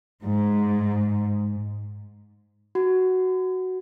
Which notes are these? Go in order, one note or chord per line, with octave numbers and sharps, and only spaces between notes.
G#2
F#4